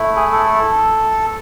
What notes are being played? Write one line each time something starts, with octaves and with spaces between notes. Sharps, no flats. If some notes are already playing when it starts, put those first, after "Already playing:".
Already playing: A3 E4
G#4
A4